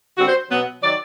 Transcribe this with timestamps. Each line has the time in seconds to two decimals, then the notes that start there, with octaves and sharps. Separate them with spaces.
0.17 D3 G3 C4 F#4
0.27 C5
0.49 B2 F#3 B3
0.81 D#3 F#3 D5